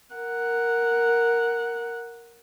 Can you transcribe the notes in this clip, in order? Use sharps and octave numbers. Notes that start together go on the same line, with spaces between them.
A#4 F#5